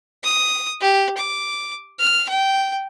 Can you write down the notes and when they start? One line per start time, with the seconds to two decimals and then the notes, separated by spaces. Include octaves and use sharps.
0.24 D#6
0.81 G4
1.17 D6
2.00 F6
2.29 G5